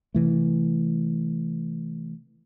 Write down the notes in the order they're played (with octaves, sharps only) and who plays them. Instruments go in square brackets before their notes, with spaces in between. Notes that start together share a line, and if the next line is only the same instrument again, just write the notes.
[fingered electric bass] C3 E3 A3